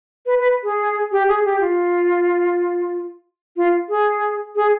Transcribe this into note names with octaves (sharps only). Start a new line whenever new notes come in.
B4
B4
G#4
G4
G#4
G4
F4
F4
G#4
G#4